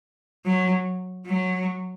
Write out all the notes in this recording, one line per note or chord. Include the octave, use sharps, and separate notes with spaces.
F#3
F#3